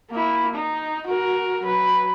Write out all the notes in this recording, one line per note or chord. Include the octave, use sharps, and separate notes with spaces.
A#3 E4
D#4
F#4 A#4
F#3 B4